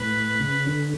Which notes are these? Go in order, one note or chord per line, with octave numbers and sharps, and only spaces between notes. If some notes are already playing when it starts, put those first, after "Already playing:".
Already playing: A2 B4
C#3
D3